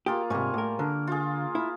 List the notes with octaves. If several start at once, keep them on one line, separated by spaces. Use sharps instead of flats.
A#3 F4 G4 G#4
G#2 C3 G3 G#5 C#6
A2 A#4
D3 A#4
F4 G#4
E4